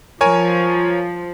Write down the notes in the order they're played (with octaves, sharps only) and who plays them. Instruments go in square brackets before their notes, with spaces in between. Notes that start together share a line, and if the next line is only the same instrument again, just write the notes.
[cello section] F3 [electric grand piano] A#4 C#5 G#5